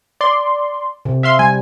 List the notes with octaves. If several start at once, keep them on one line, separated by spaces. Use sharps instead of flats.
D5 C6
C3
E5 F5 C6
G3 G#5